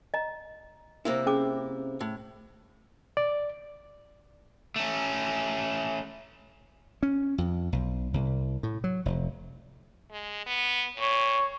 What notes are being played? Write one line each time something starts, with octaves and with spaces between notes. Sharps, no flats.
D#5 A#5
C3 A#3 E4
C#4 G#4 D6
A2
D5
A3 C#4
C#4
F2
B1
C2
A2
F#3
F1
G#3
B3
A#2 C#5